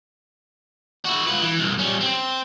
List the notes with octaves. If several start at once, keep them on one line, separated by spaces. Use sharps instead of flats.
E4 F#4
F4 B4
E3
C2 F#2
G3 C#4
C4